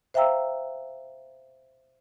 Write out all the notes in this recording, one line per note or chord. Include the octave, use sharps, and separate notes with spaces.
C5 E5 F5 G5 A#5 E6